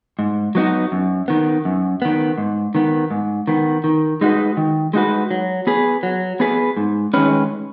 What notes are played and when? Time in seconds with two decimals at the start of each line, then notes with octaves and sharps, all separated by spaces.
0.19 G#2
0.55 F#3 B3 D#4 F#4
0.92 F#2
1.28 D#3 B3
1.65 F#2
2.02 D#3 B3
2.38 G#2
2.75 D#3 B3
3.11 G#2
3.48 D#3 B3
3.84 D#3
4.21 G#3 D#4 F#4 B4
4.57 D#3
4.93 G#3 D#4 F#4 B4
5.31 F#3
5.67 B3 G#4 B4
6.03 F#3
6.40 B3 G#4 B4
6.77 G#2
7.14 D#3 G#3 C#4 B4